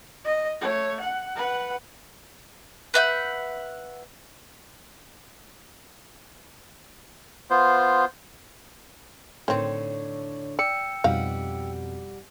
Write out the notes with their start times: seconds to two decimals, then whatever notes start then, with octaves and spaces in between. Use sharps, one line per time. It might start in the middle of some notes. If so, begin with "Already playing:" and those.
0.24 D#5
0.61 A3 C#5
1.00 F#5
1.36 B4 F#5
2.94 B4 E5 F#5 G6
7.50 B3 F4 C5
9.48 A2 D3 D#3 C4 C#5
10.59 D5 G5 E6 C#7
11.04 F2 B2 G3 D#4 F5 F#5